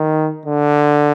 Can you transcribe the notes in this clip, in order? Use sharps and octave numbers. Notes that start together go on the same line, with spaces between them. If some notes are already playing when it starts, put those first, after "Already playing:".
Already playing: D#3
D3